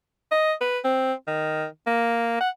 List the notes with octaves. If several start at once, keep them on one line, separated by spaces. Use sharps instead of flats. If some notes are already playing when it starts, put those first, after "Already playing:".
D#5
B4
C4
D#3
A#3
F#5